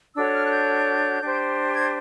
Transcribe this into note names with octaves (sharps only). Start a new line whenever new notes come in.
D4 F#4 A4 C#5 E6
F6
F#6
G6
D4 G4 C5
G#6